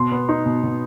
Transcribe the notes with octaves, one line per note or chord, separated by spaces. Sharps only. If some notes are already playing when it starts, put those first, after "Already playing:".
Already playing: B2 C6
B3
D#4
B2
B2